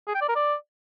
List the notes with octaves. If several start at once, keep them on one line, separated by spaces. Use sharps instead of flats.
G#4
G5
D5
A#4
D5